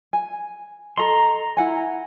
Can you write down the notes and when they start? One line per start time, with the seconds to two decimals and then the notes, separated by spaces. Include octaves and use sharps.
0.13 G#5
0.97 A4 D#5 A#5 C6
1.57 E4 F#5 G#5